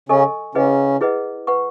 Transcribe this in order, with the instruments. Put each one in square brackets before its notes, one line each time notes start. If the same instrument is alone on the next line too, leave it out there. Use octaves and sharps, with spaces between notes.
[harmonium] C#3 C#4 [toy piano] A4 D#5 G#5 C#6
[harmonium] C#3 C#4 [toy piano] E4 G#4 B4 D#5 F#5
[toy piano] E4 G#4 B4 D#5 F#5
B4 F#5 C#6